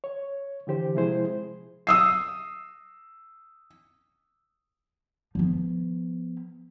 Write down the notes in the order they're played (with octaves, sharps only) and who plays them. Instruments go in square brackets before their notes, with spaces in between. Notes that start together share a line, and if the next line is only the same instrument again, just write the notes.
[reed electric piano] C#5
D3 E3 G4 C5
C3 F3 G#3 E4 G#4 C5
[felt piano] D#6 E6 C7
[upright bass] F3 B3